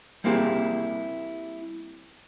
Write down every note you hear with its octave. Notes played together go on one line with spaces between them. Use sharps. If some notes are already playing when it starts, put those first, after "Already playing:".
G3 A#3 C4 E4 G4 G#4